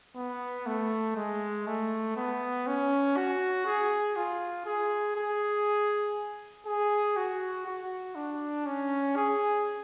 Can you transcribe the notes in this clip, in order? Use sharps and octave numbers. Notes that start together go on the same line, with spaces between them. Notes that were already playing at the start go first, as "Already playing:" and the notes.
B3
A3
G#3
A3
B3
C#4
F#4
G#4
F4
G#4
G#4
G#4
F#4
F#4
D4
C#4
G#4